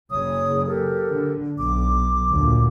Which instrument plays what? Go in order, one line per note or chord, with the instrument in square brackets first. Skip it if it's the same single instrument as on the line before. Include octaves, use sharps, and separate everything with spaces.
[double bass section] F#1 C#3 [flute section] C#5 D#6
[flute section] G4 A4 A#4
[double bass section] D3
[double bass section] B1 [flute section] D6
[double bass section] D2 A#2